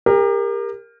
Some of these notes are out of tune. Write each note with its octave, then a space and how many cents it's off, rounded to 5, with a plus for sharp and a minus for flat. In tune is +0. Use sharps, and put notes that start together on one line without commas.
G4 +35 A#4 +0